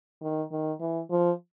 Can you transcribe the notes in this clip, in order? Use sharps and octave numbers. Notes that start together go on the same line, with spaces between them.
D#3
D#3
E3
F3